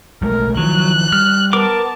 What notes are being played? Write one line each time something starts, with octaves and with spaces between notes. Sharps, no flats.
B1 G#3 A3 A#4
D#3 F3 F#3 F#6
G3 F6
B3 A#4 A5 D6